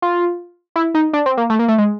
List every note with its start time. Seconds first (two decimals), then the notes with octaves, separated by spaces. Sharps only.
0.02 F4
0.76 E4
0.94 D#4
1.13 D4
1.26 C4
1.37 A#3
1.50 A3
1.59 A#3
1.68 A3
1.78 G#3